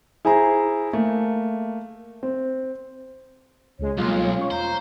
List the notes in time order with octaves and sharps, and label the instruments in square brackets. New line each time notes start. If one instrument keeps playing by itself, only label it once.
[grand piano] E4 G#4 C5 G#5 A#5
A3 A#3
C4
[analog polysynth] C#2 G#3 [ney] C#5
[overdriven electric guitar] B1 [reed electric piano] G3 G#3 A#3 [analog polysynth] F4
[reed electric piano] C#4 C#6
[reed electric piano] E2 [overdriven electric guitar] C5 [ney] A#5